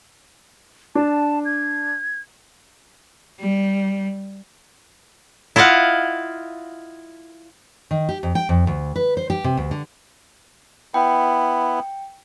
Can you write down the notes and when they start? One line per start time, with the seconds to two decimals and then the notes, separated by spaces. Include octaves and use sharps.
0.95 D4 A5
1.45 G#6
3.40 G3
5.56 E4 F4 D#5 F5 F#5
7.91 D#3
8.09 G4
8.23 F2
8.35 G5
8.49 F2
8.67 D2
8.96 B4
9.17 C5
9.30 G4
9.44 C3
9.57 D2
9.71 D3
10.94 B3 E4 G5